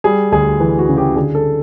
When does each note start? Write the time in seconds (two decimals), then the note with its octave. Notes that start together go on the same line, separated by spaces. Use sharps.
0.04 G3 G#4
0.32 D2 G#4
0.60 E3
0.79 F#4
0.89 C#3
0.97 G4
1.16 D3 G#4
1.35 A4